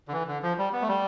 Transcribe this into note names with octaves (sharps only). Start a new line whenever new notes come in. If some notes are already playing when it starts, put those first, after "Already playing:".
D3
E3
D3
F3
G3
B3
A3
G3